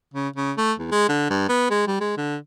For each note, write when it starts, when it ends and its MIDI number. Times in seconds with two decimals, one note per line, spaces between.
0.14 0.28 49
0.36 0.52 49
0.57 0.72 57
0.79 0.92 40
0.92 1.08 56
1.09 1.28 50
1.30 1.48 43
1.49 1.69 59
1.71 1.87 56
1.87 2.00 55
2.00 2.14 56
2.17 2.36 50